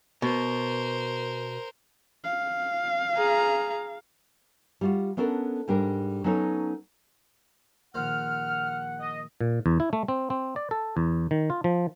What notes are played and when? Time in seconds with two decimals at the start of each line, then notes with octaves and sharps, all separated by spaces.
0.22 B2 A#4 C5
2.24 F5
3.14 G#4 A#5
4.81 G3 F4 F#4
5.17 B3 C#4 D4 A4 A#4
5.68 G#2 G3 D4 A#4
6.24 F#3 B3 C#4 D#4 A4 C#5
7.94 A#1 D#3 C5 F#5 F6
9.00 D#5
9.41 A#2
9.66 E2
9.80 E4
9.93 A3
10.08 C4
10.30 C4
10.56 D5
10.71 A4
10.97 E2
11.31 D#3
11.50 F4
11.64 F3